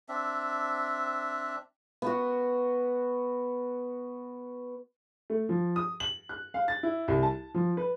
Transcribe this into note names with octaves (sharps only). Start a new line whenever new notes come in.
C4 D4 E5
B3 F#4
A3
F3
D#6
F#7
F#6
F5
A6
E4
C2
A5
F3
B4